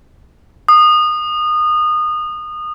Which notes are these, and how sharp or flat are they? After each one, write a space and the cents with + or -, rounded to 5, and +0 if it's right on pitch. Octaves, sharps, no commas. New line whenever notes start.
D#6 -25